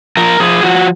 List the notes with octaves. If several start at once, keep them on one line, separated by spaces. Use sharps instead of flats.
F3 A#4
F3 G#4
F3 F#4